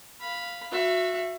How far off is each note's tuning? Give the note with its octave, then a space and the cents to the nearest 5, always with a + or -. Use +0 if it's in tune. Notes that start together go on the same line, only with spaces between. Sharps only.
F5 +0 B5 +0
F#4 -25 E5 +20